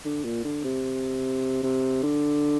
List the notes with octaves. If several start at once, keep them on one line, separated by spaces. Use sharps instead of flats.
D3
A#2
D3
C3
C3
D3